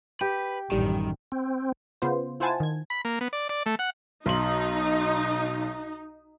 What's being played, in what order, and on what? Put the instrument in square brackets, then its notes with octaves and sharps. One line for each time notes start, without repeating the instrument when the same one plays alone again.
[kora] G4 [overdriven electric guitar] B4
[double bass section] A1 F#2 [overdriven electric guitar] D#3 [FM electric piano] G3
[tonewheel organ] C4
[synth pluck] C#3 B3 F4 C5
E4 F4 C5 F#5 G#5 A5
D#3 G#6
[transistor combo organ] B5
A#3
B3
D5
D5
A3
F#5
[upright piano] B1 C6 F#7 [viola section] D#4